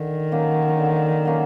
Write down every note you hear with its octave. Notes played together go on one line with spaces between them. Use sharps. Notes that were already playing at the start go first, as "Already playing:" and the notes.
Already playing: D3 D#3
F#3 A#3 C#4
D3
F#3 A#3 C#4